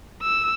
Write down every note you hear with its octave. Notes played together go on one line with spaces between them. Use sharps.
E6